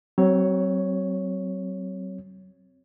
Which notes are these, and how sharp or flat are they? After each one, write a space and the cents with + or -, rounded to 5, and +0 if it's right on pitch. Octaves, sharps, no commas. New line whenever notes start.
F#3 +35 C4 +0 C#5 +0